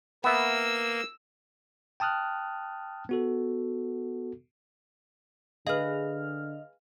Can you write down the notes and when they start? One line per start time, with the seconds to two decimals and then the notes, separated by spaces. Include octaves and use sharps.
0.24 A#3 B3 E5 E6
2.00 G5 A5 D#6 F6 F#6
3.09 B3 F#4 A4
5.67 D3 G#4 B4 D#5 F5 F6